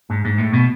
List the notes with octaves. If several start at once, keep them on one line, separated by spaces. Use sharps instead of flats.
G#2
G#2
A2
B2